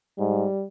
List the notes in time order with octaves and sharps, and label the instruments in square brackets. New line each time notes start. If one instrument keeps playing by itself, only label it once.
[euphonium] G#2 [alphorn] G3